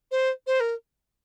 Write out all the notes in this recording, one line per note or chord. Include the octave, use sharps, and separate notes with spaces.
C5
C5
A#4